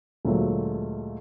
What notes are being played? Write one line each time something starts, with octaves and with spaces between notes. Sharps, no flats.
D2 A#2 F#3 G#3 A3